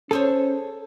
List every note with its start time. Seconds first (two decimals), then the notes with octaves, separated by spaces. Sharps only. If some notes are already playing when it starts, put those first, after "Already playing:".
0.11 C#4 G#4 A4 C5 C#5